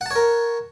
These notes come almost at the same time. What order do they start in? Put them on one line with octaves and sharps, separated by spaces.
F#5 A5 C#5 A#4